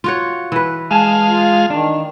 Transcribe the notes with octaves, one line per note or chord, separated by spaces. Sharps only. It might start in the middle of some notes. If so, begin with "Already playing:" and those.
F4 F#4 C#5
E3 B4
G#3 F5 G#5 A5
F4
D#3 D4